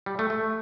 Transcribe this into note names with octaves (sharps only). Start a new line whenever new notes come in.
G3
A3
A3